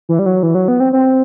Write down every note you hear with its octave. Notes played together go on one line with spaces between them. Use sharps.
E3
G3
F#3
E3
F#3
B3
C4
C4